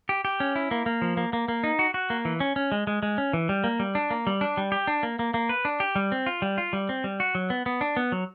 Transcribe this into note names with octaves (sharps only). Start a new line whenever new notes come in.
G4
G4
C#4
E4
A#3
A#3
F3
A#3
A#3
A#3
D#4
F#4
F#4
A#3
E3
C#4
C#4
G#3
G#3
G#3
C#4
E3
G3
A#3
G3
D4
A#3
G3
D4
G3
G4
D4
A#3
A#3
A#3
B4
D4
G4
G3
C4
F4
G3
F4
G3
C4
G3
F#4
F#3
B3
B3
D4
B3
F#3